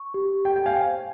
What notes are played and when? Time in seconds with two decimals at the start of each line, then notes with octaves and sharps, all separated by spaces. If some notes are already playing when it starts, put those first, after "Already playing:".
Already playing: C#6
0.14 G4
0.45 G4 G5
0.56 G5
0.66 F5 G#5
0.77 C5